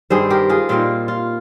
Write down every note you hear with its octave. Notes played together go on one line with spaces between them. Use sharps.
G2 D#3 G3 C4 G#4 C5
G4 A#4
F4 G#4
A#2 G3 A#3 D#4 F4
F4